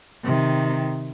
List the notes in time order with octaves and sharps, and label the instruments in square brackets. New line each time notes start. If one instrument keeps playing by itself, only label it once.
[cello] C3 D#3